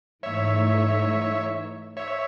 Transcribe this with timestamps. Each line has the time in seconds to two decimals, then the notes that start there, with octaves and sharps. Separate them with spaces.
0.23 G#2 E3 A3 D#4 C#5 E5
1.97 C#5 E5